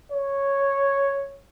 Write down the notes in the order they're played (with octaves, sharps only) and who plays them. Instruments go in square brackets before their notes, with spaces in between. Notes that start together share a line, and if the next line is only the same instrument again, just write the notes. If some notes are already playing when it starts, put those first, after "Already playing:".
[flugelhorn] C#5